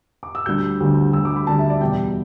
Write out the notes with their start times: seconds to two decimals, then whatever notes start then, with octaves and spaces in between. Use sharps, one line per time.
0.23 D6
0.35 E6
0.46 D2 D3 G3 G6
0.80 D2 D3 G3
1.13 D2 D3 G3 E6
1.25 D6
1.36 B5
1.47 D2 D3 G3 A5
1.59 E5
1.70 D5
1.81 E2 B2 G3 G5